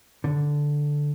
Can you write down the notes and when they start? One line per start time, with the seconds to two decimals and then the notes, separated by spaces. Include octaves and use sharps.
0.24 D3